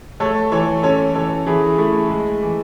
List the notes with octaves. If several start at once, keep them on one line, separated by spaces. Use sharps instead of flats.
A3 A4 C#5
E3 A4 C#5
C#4 A4 C#5
E3 A4 C#5
E3 E4 G#4
A3 E4
G#3
E3